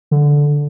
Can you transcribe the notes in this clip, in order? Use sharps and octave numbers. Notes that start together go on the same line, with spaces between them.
D3